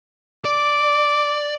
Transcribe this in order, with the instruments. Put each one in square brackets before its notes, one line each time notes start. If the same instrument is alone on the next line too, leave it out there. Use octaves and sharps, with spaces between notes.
[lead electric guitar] D5 [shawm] D6